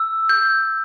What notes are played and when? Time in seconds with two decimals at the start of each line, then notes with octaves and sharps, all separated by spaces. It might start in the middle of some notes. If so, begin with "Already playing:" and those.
Already playing: E6
0.29 G6